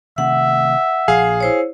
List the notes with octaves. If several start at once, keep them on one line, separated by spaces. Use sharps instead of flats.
C3 D#3 A3 E5 F#5
A#1 F3 G#4 F5
E4 C5 C#5